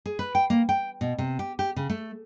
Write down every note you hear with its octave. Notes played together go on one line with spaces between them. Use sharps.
G#4
B4
G5
A#3
G5
B2
C3
G4
G4
C#3
A3